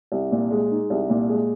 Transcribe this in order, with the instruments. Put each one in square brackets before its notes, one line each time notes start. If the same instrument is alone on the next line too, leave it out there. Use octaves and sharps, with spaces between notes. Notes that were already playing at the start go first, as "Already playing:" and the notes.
[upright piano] C2
A#2
G#3
D#4
C2
A#2
G#3